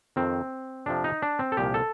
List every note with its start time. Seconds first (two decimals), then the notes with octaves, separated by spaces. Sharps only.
0.16 F2 D#3 C4
0.86 F2 C3 F3 D4
1.04 D#4
1.22 D4
1.39 C4
1.52 A4
1.57 C2 A#2 F3 G4
1.74 A4